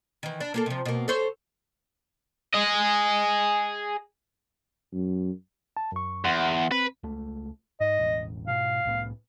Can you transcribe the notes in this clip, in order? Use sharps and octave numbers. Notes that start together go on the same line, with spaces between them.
D#3 E3
D4
A#3 G#4 A4
C3 F3
B2 A#3
A4 C5 C#5
G#4 D#5
F#2
A5
F#2 C#6
E2 F#5 C6
C4 B4
C#2 A3
G#2 D#5
E1 A1
G#2 B2 F5
C2 A2 B3